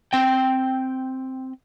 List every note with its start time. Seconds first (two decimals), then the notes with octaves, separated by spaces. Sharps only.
0.13 C4 G5